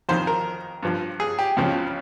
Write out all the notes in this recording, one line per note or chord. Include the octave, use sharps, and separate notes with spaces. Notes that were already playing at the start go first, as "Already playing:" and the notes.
F2 D#3 C5
A#4
G2 F3
G#4
G4
C#2 C#3 F3